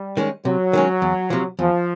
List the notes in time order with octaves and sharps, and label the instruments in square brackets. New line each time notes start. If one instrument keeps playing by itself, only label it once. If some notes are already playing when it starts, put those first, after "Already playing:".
Already playing: [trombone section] G3
[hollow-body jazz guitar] D#3 G#3 C#4
[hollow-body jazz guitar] C3 [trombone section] F#3
[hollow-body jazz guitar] D#3 G#3 C#4
E2
C3 F3
[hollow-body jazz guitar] E2 [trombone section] F3